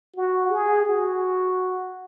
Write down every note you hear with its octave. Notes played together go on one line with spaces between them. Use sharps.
F#4
G#4
F#4